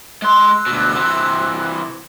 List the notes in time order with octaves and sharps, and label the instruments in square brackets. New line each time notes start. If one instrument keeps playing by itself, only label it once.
[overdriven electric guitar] G#3 C6 [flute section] E6 F#6
[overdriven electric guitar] D2 B2
C3 E3